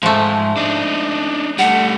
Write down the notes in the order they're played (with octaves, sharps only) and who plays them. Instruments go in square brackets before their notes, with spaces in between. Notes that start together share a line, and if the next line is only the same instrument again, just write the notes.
[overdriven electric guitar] G#2 [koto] F3 A3
[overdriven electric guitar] D4 D#4
[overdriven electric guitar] G3 A3 [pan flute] F#5